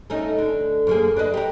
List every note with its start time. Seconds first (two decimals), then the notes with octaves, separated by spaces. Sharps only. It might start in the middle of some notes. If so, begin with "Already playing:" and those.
0.10 A3 C#4 D#4
0.39 D3
0.87 F#2 A#3 G#4
1.16 D4 B4 D#5
1.34 G4 A#4